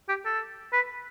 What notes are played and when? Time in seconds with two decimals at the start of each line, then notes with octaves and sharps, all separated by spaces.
0.09 G4
0.25 A4
0.73 B4